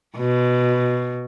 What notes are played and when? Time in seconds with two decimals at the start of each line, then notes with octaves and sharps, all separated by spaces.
0.17 B2